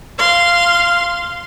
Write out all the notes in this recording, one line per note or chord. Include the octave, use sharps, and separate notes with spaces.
F5 C6